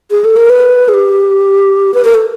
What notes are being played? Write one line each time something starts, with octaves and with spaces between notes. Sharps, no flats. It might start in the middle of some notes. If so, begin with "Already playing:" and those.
G#4
A4
A#4
B4
G#4
G4
B4
A#4
A4